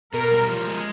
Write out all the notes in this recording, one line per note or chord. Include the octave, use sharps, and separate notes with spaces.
B2 A#4
G3
F3
G#3